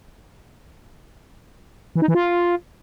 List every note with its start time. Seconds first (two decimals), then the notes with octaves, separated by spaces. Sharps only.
1.96 E3
2.02 D#4
2.08 E3
2.15 F4